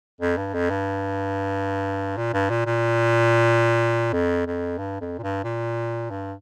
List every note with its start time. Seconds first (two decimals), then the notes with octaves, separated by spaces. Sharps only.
0.21 F2
0.37 G2
0.54 F2
0.70 G2
2.17 A#2
2.33 G2
2.50 A#2
2.67 A#2
4.13 F2
4.46 F2
4.79 G2
5.01 F2
5.18 A#2
5.23 G2
5.44 A#2
6.10 G2